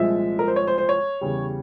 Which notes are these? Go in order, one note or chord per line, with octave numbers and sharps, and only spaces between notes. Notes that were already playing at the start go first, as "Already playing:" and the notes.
Already playing: C2 A#2 F3 G#3 E5
A#4
C5
C#5
C5
C5
C#5
E2 C#3 G3